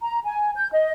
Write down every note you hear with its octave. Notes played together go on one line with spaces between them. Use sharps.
A#5
G#5
G6
D#5